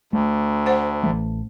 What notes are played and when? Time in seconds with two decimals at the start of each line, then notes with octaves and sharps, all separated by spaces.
0.13 D2 A3
0.66 C5 F#5
1.04 A1 E3 A3